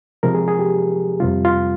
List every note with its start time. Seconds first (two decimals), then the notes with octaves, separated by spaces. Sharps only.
0.23 C3 F3 G#3 A#4
0.35 G#4
0.48 G#4
0.59 G4
1.20 F2 C3 G3 F4
1.45 F4